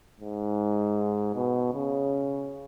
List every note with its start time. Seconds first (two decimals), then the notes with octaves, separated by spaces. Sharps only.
0.20 G#2
1.36 B2
1.74 C#3